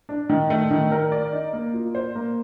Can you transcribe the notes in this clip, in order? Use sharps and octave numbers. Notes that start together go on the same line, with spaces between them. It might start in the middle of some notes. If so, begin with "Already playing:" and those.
D4
D#3
A3
D#3
A#4
D5
D#4
A#3
F4
C5
A#3